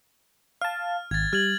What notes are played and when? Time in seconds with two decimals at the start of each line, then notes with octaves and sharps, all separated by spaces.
0.61 F5 A5 F6
1.11 G#1 G#6 A6
1.33 G3 F6 G#6 F#7